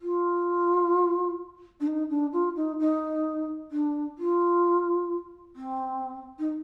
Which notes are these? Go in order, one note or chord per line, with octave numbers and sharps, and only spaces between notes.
F4
D4
D#4
D4
F4
D#4
D#4
D4
F4
C4
D#4